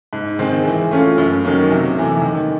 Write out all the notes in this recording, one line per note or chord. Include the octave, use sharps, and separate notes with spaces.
G#2
D#3 G#3 C4
E3
A3 C#4 F4
F#2
D#3 F#3 A#3 C#4
C3
E3 A3
D#3